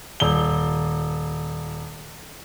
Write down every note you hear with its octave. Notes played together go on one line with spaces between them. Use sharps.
D#1 G7